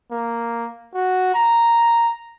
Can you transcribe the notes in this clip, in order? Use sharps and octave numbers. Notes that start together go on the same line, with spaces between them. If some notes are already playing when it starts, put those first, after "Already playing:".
A#3
F#4
A#5